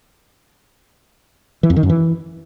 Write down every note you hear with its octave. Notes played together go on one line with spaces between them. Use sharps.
E3
F2
D#3
F#2
E3